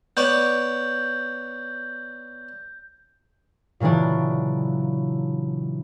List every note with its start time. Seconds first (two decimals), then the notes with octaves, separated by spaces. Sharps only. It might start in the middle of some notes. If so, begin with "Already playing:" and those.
0.17 B3 C#5 D5 G6
3.80 A#2 C#3 E3 F#3 D4